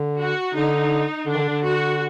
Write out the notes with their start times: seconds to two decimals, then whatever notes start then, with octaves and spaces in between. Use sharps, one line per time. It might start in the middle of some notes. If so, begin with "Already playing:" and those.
Already playing: D3
0.18 F#4
0.54 D3 D#4
1.26 D3 D4
1.34 D#3
1.38 D3
1.50 D3
1.63 F#4